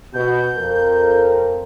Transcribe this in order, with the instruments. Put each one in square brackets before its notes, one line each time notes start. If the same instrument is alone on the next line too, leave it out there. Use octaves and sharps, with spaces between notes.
[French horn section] B2 [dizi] G6
[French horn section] F2 [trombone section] A#4